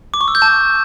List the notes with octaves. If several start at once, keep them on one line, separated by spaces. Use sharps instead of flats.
D6
C#6
E6
G6
A5